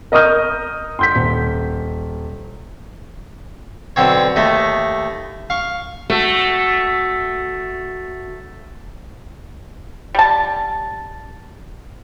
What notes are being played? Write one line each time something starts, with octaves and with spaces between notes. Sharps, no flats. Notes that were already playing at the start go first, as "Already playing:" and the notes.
A#4 D#5 C#6 D#6 F6 G6
C6 G6 B6
D#1
B1 D3 C4 C#5
D#2 A3 D#5
F5 C#6
A3 F#4
G3 A5